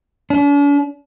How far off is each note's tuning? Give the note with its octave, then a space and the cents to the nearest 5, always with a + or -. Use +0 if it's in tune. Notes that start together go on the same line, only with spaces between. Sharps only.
D4 -45